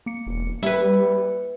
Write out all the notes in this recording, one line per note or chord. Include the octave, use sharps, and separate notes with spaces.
A#3 C#7
E1
G3 E4 B4